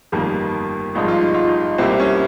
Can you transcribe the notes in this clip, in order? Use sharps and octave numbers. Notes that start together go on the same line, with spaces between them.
G1 F2 D#3 G3 A#3
G#1 G2 F3 G#3 D#4
F4
D#4
F4
D#4
C2 C3 G3 A#3 C4
C#4